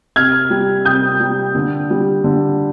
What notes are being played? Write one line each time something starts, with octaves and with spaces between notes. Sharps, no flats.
C3 F6 G#6
G3
C3 D#6 G6
G3
D3
G3
D3